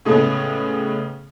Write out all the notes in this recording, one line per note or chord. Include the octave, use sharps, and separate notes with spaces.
A2 C#3 G#3 A3 B3